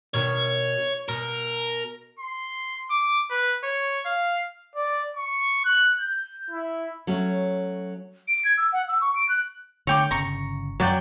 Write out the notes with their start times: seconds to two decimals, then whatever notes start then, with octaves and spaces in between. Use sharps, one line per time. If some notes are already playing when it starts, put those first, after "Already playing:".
0.14 B2 D#3 C#5
1.09 B2 A#4
2.19 C6
2.90 D6
3.30 B4
3.64 C#5
4.06 F5
4.76 D5
5.17 C#6
5.65 F#6
6.00 G6
6.51 E4
7.07 F#3 A3 C#4
8.28 D7
8.45 G#6
8.58 E6
8.73 F#5
8.88 E6
9.01 C#6
9.15 D7
9.29 F#6
9.87 D3 A3 C#5 G5 D6
10.11 G1 C#3 A#5 C#6
10.80 F#2 F#3 D5 G5